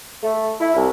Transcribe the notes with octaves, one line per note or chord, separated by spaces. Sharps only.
A3
E4
C2